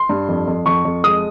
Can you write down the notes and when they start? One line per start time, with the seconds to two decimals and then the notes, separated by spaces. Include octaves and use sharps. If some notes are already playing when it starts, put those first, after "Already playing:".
Already playing: C6
0.09 G2
0.28 F2
0.47 F2
0.66 F2 C#6
0.85 F2
1.04 G#3 D#6